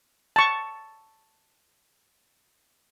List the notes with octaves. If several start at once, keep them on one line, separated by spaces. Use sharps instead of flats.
A5 C#6